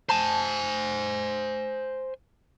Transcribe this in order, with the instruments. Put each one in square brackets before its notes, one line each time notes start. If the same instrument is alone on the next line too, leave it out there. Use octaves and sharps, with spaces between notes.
[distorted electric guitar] C5 G#5 [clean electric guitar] A5